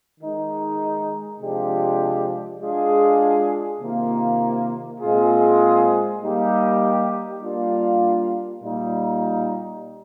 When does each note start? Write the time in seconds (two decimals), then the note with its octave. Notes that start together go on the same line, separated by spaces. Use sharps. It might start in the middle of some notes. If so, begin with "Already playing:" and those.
0.20 D#3 G#3 D#4
1.40 C3 F3 G#3 D4 G4
2.61 G#3 D4 F4 G#4
3.81 C3 D#3 A#3 F4
5.01 A#2 G#3 C4 F4 G#4
6.21 G3 A#3 D#4 G4
7.42 G3 A#3 D4 F4
8.62 A#2 G3 A#3 D#4